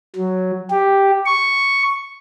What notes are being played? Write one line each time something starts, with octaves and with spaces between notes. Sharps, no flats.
F#3
G4
C#6